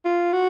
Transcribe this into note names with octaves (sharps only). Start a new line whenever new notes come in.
F4
F#4